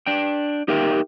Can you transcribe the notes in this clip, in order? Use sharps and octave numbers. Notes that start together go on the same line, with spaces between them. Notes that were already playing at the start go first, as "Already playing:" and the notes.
D4 G5
D#4 G4 A#4 E5 G5